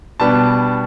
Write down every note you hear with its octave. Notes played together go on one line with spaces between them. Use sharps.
B2 G3 B3 D4 A5